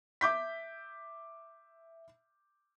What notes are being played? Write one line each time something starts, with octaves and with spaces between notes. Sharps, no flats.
E5 D6 G6 B6